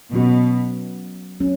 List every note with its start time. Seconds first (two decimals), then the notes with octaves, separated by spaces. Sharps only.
0.13 B2 F#3 C#4 F#4
1.40 F#3 C#4